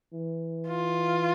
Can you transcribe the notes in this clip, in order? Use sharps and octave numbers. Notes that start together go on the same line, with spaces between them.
E3
F4